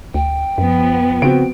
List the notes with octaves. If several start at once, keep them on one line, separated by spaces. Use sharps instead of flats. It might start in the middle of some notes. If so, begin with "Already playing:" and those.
D2 G5
F#2 F3 B3
C#3 C4 F#4 D7